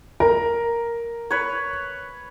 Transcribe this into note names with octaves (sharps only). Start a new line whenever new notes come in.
A#4
B4 C#5